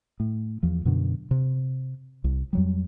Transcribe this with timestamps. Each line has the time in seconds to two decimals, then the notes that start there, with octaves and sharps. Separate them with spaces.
0.20 A2
0.63 E2 F3
0.85 F#2 B2 D3
1.31 C3
2.24 C2
2.53 F2 F#3 G3